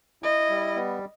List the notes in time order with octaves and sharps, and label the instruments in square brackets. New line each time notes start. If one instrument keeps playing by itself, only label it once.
[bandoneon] E4 [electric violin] D#5
[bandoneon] G3
B3